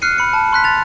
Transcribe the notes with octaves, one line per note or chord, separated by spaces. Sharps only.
F6 F#6 C7 C#7 D#7
B5 C#7
A5
C6 F#6 B6
A6 F7